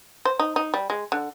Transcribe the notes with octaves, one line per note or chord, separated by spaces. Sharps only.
C5
D#4
D#4
G3
G#3
D3